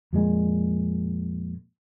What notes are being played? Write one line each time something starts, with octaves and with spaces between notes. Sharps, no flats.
F2 A#2 G#3